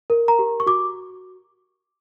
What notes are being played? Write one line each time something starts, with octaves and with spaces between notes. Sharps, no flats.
A#4
A#5
G4
C#6
F#4 D6